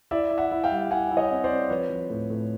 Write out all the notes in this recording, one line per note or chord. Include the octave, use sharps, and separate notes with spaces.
E4 D5 E5
E4
E5 F#5
E4
F5 G5
G3
E4 F#5 G#5
E4
C#5 D#5
C4
C5 D5
C4
F3 B4 C#5
F3
A2
A2